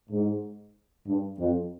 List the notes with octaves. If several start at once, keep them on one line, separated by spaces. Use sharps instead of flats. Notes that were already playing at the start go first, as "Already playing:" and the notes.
G#2
G2
F2